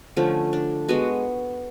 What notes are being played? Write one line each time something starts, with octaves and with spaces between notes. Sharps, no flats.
D3 F3 A3 C#4
D4
G#3 B3 F#4